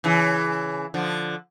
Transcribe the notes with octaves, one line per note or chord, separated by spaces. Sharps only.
C#3 E3
D3 F3